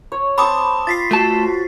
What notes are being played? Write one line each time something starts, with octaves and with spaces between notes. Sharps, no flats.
C#5
C4 C5 A5 B5 D6 D#6
F4 A6 B6 C7
A3 F#4 A5